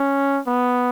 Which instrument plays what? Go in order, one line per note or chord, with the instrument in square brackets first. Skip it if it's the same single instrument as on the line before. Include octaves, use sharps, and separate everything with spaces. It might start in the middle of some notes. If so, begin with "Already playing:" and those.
Already playing: [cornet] C#4
B3